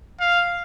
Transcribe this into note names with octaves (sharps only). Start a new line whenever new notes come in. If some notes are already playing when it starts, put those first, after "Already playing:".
F5